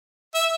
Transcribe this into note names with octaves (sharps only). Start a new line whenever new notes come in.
E5